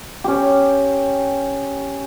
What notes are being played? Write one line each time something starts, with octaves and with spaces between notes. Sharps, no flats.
C#4 G4